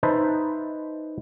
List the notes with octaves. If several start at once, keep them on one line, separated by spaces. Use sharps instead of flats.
D#4 B4 C5 E5 A5